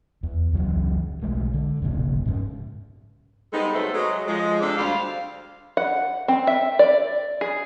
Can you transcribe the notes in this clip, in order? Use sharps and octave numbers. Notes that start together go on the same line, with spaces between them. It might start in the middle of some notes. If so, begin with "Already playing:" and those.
E2
C#2 E3 F#3
B1 G#3 A3
D3
F1 B1 A#2 C#3
G#2 F3 C#4
G3 G#3 B3 C4 D#4 A4
C3 F#3 A3 B3 A4 C5
F#3 G#3
F3 G#3
C3 D4 G4 A4 D5
D2 G3 C5 F5
F#5
C4
E5
D5
G#4